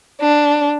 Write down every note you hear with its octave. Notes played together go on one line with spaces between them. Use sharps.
D4